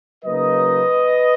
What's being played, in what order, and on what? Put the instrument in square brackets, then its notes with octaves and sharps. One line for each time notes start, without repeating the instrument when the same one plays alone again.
[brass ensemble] C#3 F#3 A#3 D#4 B4 D#5